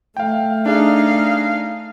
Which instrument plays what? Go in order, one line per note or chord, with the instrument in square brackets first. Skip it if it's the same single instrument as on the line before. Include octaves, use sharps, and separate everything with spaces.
[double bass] A3 [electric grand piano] F5 G5
[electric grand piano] D4 G#4 [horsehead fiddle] D#4 F5